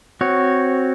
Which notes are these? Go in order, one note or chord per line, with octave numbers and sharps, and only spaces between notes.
C4 F#4 C#5